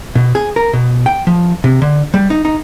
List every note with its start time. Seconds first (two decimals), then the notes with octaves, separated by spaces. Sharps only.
0.15 B2
0.35 G#4
0.56 A#4
0.73 B2
1.06 G5
1.27 F3
1.64 C3
1.82 D3
2.14 G3
2.30 D#4
2.45 D#4